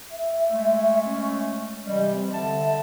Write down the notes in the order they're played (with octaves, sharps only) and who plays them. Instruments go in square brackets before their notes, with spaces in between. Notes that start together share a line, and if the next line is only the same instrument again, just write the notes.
[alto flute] E5
[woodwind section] G#3 A3
[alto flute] C#4
[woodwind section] C3 E3 G3 [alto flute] D#5
[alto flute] C4
[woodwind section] D3 A5 [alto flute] E5